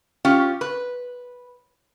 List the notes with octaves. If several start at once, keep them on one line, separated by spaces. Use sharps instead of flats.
C#4 F4 G4
B4